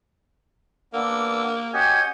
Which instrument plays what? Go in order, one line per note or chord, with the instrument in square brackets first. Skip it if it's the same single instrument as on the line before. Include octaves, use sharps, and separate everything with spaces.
[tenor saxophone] A#3 [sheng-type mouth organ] B3 D4 [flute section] E6
[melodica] C#4 D#5 G#5 [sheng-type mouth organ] F#4 G4 [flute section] F#5 G6 G#6